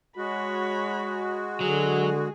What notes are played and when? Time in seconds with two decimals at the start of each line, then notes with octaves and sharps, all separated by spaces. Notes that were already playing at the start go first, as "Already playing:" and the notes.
0.17 G#3 F#4 C#5 B5
1.61 D3 F#3 G#4